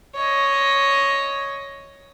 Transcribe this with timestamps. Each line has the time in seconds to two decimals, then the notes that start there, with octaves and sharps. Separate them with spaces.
0.15 C#5 D#5